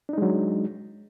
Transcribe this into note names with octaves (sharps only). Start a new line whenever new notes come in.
F#3 G#3 D4 D#4